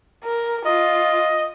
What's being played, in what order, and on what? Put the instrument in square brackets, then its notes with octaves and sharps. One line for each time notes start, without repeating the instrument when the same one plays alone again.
[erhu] A#4
[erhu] F4 [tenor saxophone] D#5